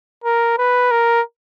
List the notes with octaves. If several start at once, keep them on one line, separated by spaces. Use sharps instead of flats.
A#4
B4
A#4